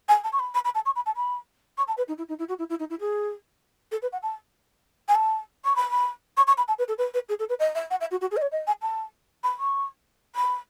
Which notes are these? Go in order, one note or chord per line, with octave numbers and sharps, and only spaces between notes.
G#5
A5
C#6
B5
B5
B5
A5
C#6
B5
A5
B5
C#6
A5
B4
D#4
E4
D#4
E4
F#4
E4
E4
D#4
E4
G#4
A4
B4
F#5
A5
G#5
A5
C#6
B5
B5
C#6
C#6
B5
A5
B4
A4
B4
B4
G#4
A4
B4
D#5
E5
F#5
E5
F#4
F#4
G#4
D#5
C#5
D#5
G#5
A5
B5
C#6
B5